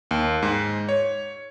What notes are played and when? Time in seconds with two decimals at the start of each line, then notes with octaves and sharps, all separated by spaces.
0.11 D#2
0.43 G#2
0.89 C#5